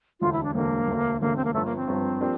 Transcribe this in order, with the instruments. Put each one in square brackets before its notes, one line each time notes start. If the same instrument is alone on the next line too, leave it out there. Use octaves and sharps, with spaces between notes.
[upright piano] E1 D2 D3 [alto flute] F4
[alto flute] E4
D4
[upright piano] E1 D2 D3 [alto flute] A#3
[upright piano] E1 D2 D3
[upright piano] E1 D2 D3 [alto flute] A#3
[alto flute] C4
A#3
[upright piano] G1 G2 F3 [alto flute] A3
[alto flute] A#3
C4
[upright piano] G1 G2 F3
F3 A#3 D4 G4